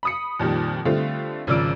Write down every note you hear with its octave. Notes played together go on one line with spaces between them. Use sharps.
B5 D#6 C#7
F2 A#2 D#3 G3
D3 G3 A3 C4 F4
G#1 C#3 F3 D5 E6 D7